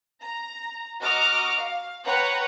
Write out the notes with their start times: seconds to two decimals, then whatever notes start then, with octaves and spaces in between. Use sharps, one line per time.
0.21 A#5
1.02 F#4 D#5 A#5 C#6 D6 F6
1.59 F5
2.04 B4 C#5 F#5 G5 A#5